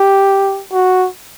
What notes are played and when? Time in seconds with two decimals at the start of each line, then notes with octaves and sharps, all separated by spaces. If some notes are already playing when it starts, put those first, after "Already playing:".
Already playing: G4
0.73 F#4